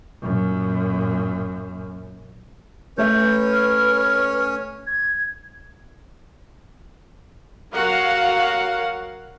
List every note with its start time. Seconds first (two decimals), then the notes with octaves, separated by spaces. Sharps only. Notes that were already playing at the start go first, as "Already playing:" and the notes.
0.22 F#2 A#2
2.98 A3 C#4 B4 C#5 E5 G6
3.51 F6
4.87 G#6
7.73 F#3 F#4 A#4 F5 F#5